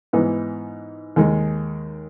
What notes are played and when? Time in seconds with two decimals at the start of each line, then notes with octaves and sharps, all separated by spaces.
0.13 G#2 E3 B3 D#4
1.16 D#2 D#3 G#3 D#4